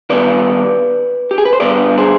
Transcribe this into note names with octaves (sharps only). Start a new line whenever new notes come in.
D#3 G3 B3 B4 D5
G4
G#4
B4
C5
D3 G3 B3 B4 D5
G#4 C5